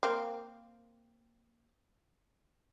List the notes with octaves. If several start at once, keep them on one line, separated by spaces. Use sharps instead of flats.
A#3 C4 F5